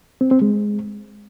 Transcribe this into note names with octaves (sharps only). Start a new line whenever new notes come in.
C4
C4
G#3